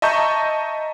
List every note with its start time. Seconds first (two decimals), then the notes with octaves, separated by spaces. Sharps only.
0.02 D#5 E5 A5 A#5 C#6 G6